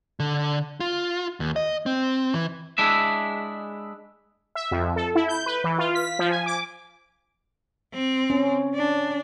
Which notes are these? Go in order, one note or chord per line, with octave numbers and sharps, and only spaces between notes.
D3
F4
D#2
D#5
C4
E3
G#3 D4 E4 E5
E5
F2
A4
E4
G6
B4
E3
F4
B6
F3
G#5
D6
C4
C#4
D4